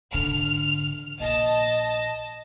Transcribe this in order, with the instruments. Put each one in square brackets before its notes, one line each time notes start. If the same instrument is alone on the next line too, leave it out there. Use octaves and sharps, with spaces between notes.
[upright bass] G#2 D3 [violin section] F6
[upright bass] A#1 [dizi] D#5 [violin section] A5